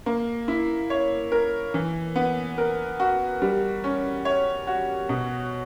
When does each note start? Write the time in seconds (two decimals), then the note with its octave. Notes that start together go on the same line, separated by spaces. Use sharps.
0.06 A#3
0.48 E4
0.90 C#5
1.32 A#4
1.74 E3
2.16 B3
2.58 A#4
3.00 F#4
3.42 G3
3.84 C#4
4.25 C#5
4.67 F#4
5.09 B2